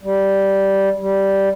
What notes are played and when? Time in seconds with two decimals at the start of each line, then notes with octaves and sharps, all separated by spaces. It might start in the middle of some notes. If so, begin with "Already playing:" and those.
0.03 G3
1.01 G3